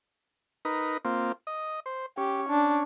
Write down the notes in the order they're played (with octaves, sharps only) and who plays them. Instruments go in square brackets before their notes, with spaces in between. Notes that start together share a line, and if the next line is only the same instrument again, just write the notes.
[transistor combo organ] D#4 A#4 B4
A#3 C4 F4
D#5
C5
[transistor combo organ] C#4 [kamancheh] G4
[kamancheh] D4